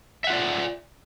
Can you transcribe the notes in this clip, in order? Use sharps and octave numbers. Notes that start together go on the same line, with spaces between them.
F4 D5 E5 F#5